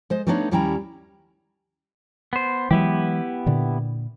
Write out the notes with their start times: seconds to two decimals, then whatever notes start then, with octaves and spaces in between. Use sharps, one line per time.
0.10 G#3 C5 D#5
0.27 G3 A3 B3 D4 D#4 C#5
0.51 D#2 G3 C#4 E4 G5 A#5
2.33 B3 C5
2.71 E3 F#3 G#3 B3 E4 G4
3.46 A#2 D3